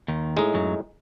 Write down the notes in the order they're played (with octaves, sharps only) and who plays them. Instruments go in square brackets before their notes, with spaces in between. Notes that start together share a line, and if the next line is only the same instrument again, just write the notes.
[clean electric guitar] D#2 D#3
[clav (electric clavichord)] A2 G#3 D#4
[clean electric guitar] F#2 F#3